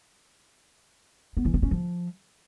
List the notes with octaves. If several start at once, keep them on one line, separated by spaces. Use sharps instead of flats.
B3
E3
C4
C#4
F3